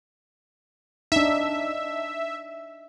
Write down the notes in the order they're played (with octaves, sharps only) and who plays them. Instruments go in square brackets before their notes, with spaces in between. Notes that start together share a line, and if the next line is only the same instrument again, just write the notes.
[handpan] D4 D#4 [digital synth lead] E5